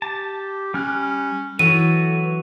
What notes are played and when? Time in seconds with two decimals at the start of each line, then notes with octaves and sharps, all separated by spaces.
0.02 G4 A5
0.74 G3 C#4 F6 F#6
1.59 E3 F#3 F#4 A4 C#5 D#7